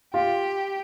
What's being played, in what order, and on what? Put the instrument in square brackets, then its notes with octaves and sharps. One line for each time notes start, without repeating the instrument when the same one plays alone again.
[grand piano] F4 [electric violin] G4